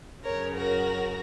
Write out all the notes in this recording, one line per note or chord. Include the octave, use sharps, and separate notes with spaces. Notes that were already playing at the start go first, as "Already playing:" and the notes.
F#2 C#3 A#4 C#5
F#4 A#4